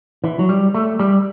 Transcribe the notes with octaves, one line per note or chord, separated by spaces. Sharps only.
E3
F#3
G3
A3
G3